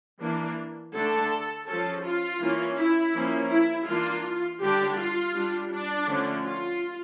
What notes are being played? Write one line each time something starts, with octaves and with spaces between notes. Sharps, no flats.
E3 A#3 D4
D3 A3 D4 A4
F3 C#4 A4
F4
E3 A#3 C#4
E4
F3 A#3 C#4
E4
E3 A#3 D4 F4
D3 G3 D4 G4
F4
G3 D4
D4
D3 F3 A3 C#4
F4